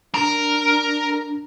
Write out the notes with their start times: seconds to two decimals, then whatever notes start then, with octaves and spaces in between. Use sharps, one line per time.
0.14 D4 A#4 A#5